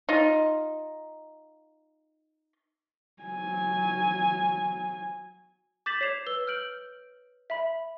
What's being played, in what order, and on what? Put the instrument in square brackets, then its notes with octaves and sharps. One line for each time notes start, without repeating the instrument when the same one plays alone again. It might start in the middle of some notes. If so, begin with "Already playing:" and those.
[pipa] D#4 F4 D#5
[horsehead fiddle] F#3 G#5
[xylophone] D6 G6 A6 B6 E7 F#7
C#5 C7 E7 F7
B4 E6 G7
F6 G6 D7 F#7
E5 B5